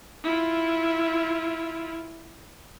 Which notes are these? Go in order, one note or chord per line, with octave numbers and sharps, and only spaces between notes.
E4 F4